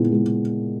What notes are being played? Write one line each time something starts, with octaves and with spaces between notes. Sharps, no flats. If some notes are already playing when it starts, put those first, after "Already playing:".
Already playing: A#2 G#3 B3 E4
G#3